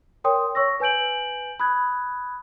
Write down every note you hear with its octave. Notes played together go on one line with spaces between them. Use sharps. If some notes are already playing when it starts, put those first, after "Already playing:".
A#4 C#5 G5 C6 D#6
C#5 C#6 E6 A#6
B4 G#5 G6 D7 F#7
B5 D#6 F#6 G#6